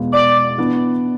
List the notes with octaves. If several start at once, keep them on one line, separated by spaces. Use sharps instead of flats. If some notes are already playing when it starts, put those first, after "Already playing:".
Already playing: E2 B2 G#3 B3 F4
D5
E3 B3 D4